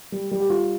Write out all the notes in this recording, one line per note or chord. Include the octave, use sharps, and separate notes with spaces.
G3
G3
G4
G3 F4